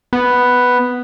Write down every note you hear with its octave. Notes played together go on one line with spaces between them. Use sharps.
B3